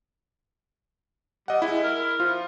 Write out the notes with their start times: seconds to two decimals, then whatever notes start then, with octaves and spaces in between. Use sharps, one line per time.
1.48 G3 D#5 F#5
1.62 G#3 E4
1.83 A#4
2.20 F3 F4